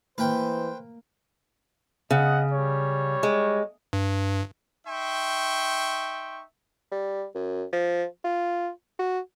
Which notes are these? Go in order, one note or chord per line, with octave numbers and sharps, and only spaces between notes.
E3 A#3 B4 C5 G5
C#3 D#5 F#5
G3 C#5
G#3
G2
D#4 E5 G5 C6 C#6
G3
F#2
F3
F4
F#4